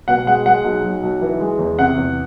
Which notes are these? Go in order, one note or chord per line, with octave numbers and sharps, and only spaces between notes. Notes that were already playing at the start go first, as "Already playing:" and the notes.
B2 F#5
G#3 F#5
G#3 F#5
B1
B1
B1
E3
G#3
E2
C3 F#5
E2